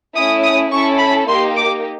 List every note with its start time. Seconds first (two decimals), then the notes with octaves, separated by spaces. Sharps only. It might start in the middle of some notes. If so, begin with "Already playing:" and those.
0.16 A3 C#4 E4 D#6
0.43 D#6
0.71 C#4 E4 A4 C#6
0.99 B5
1.28 A#3 D#4 G4 C6
1.56 D6